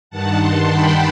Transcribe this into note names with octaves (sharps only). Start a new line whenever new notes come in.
G2 D#3 F#5 A5
A5 C6
G5 B5